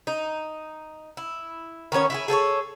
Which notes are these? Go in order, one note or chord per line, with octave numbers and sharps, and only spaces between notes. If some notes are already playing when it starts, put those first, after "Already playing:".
D#4
E4
D#3 B3 C#4 C#5
E4 F4 G#4
G#4 A4 C5 C#5